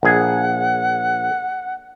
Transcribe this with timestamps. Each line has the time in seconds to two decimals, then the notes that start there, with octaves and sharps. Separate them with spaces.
0.03 A#1 G#4 F#5